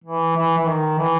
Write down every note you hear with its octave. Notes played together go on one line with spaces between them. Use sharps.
E3
E3
E3
D#3
E3